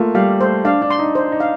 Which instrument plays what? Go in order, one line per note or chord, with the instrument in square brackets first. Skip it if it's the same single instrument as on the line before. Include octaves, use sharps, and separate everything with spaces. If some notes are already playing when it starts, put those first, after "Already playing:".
Already playing: [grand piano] A3 A#3 [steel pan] F4
[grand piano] G3 [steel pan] F5
[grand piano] A3 [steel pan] C5
[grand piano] D4 [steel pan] F5
[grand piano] D4
[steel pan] C6
[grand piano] D#4
[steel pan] C5
[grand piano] D#4
[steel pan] F5